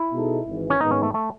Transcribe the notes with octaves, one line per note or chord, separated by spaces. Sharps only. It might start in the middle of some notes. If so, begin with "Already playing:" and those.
Already playing: E4
B2 G#3 D#4 A4
G#1 G#2 E3
C#4
G#2 D#3 G#3 B3 D#4
C#4
A3
A3